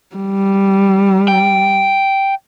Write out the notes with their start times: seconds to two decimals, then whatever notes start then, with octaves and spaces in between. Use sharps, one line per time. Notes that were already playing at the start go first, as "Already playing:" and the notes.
0.16 G3
1.28 G5